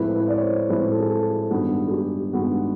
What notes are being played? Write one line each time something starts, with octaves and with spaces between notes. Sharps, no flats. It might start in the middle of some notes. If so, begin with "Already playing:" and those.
Already playing: A2 F3 G#3 C4 E4 B4
B4
D5
C#5
C5
A2 F3 G#3 C4 E4 B4
A4
G#4
A4
G#4
G2 D#3 G#3 B3 F#4
G#4
G4
G2 D#3 G#3 B3 F#4